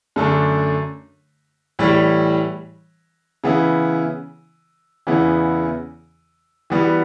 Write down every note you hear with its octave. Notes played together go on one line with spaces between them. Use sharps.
F#2 D3 A3 D4
A2 E3 G3
C#3 E3 B3 E4
E2 C#3 E3 B3 E4
E3 G3 B3 F#4